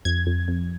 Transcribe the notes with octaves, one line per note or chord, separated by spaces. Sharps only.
F2 G#6
F2
F2